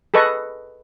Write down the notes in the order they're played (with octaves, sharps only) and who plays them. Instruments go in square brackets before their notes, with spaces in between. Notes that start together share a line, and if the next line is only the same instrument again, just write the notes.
[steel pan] G#4 A4 B4 D#5 C#6